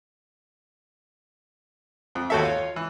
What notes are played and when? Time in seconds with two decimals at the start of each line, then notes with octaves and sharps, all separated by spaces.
2.15 F2
2.30 D#2 F#4 A4 C#5 E5
2.43 F4 C#5
2.76 E3